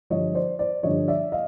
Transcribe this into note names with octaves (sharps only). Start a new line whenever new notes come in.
G2 D3 F3 C#5 D#5
C5 D5
C5 D5
G2 D3 F3 C#5 D#5
D5 E5
D#5 F5